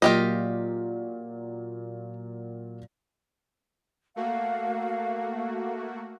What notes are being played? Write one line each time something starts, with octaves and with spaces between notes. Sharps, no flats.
A#2 F#3 A#3 F4 G4 D#5
A3 A#3 F#4 F5